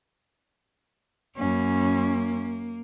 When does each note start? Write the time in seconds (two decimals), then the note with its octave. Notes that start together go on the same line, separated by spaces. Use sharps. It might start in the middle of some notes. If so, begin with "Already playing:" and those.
1.37 F#2 A#3 C#4